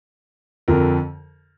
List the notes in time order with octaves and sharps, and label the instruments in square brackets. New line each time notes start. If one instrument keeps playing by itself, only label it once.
[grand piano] F2 D3 F3 A#4